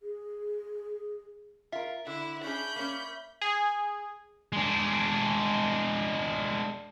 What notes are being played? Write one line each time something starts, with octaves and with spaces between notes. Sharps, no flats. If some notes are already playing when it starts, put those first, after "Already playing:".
G#4
F4 A#4 E5
D3 E4
C#4 D4 G#4 B5 G6
A#3 C#4
G#4
G#3 D4